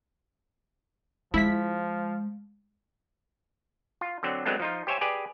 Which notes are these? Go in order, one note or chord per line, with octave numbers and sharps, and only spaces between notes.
F3 G#3 E4 B6
F4
D3 F#3 C4
F#3 G#3 A3 B3 C4 D4
F3 D#4 F4
G4 C5 C#5 E5 G#5
G4 G#4 B4 D5 G#5